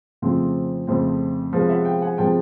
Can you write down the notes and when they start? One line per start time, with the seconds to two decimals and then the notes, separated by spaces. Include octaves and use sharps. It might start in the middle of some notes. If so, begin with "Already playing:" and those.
0.22 F2 C#3 F3 A3 C4
0.87 F2 C#3 F3 A3 C4
1.53 C3 F3 G#3 B3 F5
1.69 E5 F#5
1.85 F5 G5
2.02 F#5 G#5
2.18 C3 F3 G#3 B3 G5 A5